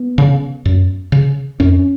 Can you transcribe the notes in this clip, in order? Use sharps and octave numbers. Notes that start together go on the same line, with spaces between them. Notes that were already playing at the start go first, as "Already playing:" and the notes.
Already playing: B3
C#3
F#2
C#3
F2 C#4